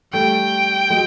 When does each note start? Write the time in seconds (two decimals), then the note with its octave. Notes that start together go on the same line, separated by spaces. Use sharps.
0.13 G3 A3 G5
0.90 F#3 G#3